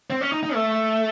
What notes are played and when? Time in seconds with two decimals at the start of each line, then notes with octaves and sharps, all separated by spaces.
0.10 C4
0.21 C#4
0.32 D#4
0.43 D#4
0.54 A3